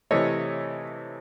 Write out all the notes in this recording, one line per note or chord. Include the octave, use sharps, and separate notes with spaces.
C3 E3 A3 C#5 D#5